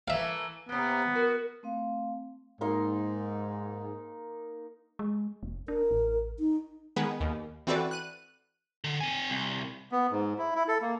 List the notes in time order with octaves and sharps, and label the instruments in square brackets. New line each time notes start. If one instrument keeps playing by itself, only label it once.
[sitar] E3 A3 A#3 [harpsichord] E5 F5
[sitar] C3 A#3 [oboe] B3
[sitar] F#4 [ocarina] A#4
[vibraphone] A3 C4 F5
[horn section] G#2 [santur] A#3 D#4 C6
[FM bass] G#3
F1
[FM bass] D4 [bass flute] A#4
[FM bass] A1
[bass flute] D#4
[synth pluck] D#3 G#3 B3 G#4 B4
D#2
E3 C4 F#4 A4 B4 D5
F#6 D#7
[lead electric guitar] D3
C4 G#5
C2
[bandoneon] B3
G#2
E4
E4
A4
A#3